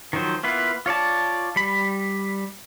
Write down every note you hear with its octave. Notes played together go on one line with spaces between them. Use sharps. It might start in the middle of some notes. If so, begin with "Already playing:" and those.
D#3 F3 F#3 C5
A#3 B3 E4 F4 B4
F4 C#5 D5 A5
G3 B5